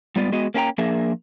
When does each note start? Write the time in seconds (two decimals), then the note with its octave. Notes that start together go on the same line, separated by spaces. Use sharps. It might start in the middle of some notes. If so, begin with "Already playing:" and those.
0.16 G#2 G3 B3 F4 D5
0.32 G#3 B3 F#4 D#5
0.54 A#3 C#4 E4 A4 G5 A#5
0.78 F3 A#3 D4 G#4 A#4 E5